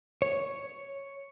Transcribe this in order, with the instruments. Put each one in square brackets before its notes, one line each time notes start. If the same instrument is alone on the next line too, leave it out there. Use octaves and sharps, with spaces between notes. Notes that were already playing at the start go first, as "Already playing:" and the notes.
[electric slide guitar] C#5